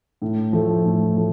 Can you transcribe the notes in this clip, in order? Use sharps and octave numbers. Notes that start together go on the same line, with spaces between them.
A2
F3 A3
A2
F3 A3